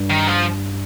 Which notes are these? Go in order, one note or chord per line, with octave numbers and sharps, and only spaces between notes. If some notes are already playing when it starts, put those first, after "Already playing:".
Already playing: G2
D#3
F3